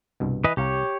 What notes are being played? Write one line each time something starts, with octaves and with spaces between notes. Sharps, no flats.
C2 G2 B2
E3 B4 D#5
C2 G4 C#5 F5 A#5